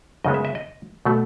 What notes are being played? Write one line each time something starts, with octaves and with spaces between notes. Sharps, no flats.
F#2 C#3 G#3 B3 D#5
E5
E5
D#5
B2 F#3 A3